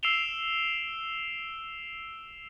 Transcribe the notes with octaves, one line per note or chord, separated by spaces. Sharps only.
E6 C7 D7 E7 F7 G7